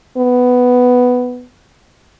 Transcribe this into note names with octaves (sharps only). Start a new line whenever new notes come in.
B3